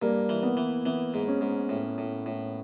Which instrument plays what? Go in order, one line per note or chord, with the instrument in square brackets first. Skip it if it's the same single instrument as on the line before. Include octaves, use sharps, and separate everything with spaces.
[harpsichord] G2 [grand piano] A#3
[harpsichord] E3
[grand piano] B3
[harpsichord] E3
[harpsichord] E3 [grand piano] B3
[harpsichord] G#2
[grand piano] C#4
[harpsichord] G#2
A2
A2
A2